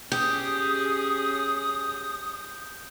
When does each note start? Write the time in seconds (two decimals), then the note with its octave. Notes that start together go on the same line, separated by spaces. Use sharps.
0.12 C#4 G4 G#4 D#6 G6